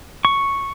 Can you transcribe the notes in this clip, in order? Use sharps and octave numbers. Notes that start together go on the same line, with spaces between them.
C#6